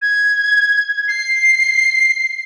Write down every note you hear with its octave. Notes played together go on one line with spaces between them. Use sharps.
G#6
C7